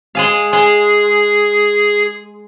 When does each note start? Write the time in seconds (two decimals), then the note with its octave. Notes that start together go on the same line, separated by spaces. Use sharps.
0.15 G#3 G#4 F5
0.53 G#3 G#4